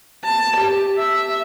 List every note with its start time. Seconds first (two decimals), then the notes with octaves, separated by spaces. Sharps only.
0.25 A5
0.56 G4
0.98 E5